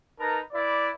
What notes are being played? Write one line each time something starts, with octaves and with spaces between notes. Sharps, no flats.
D#4 A#4 B4 A5 A#5
E4 B4 D5